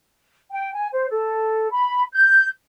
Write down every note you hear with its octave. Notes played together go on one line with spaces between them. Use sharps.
G5
G#5
C5
A4
B5
G6